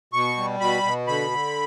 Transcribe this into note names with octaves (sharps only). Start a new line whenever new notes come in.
B2 C#6
G3
B2 B5
B2
D3 B5
D3